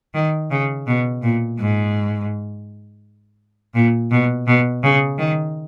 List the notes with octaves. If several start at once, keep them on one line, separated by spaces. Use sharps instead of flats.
D#3
C#3
B2
A#2
G#2
A#2
B2
B2
C#3
D#3